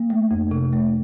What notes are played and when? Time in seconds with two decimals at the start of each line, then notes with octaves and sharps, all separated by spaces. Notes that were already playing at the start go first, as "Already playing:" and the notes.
Already playing: A#3
0.10 A3
0.31 F2
0.51 C3
0.73 A3